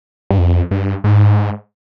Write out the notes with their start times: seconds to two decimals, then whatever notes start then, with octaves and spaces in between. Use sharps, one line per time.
0.31 G2
0.38 F2
0.71 G2
1.04 G#2